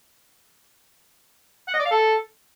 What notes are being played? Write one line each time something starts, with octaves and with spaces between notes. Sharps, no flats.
F#5
D#5
D5
F5
A4